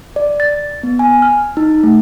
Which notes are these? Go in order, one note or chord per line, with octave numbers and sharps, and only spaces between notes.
D5
A6
B3
G#5
F6
D#4
A3